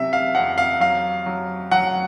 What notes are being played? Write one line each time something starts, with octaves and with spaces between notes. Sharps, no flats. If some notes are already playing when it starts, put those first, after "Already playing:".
Already playing: C3 F#3 E5
F5
F2 F#5
F5
F#3 F5
F#3
F#3 F#5